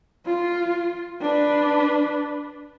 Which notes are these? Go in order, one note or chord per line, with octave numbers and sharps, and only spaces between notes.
F4
D4 B4